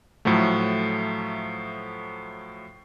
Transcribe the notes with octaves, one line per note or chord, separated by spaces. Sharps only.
A2 F3 F#3 A3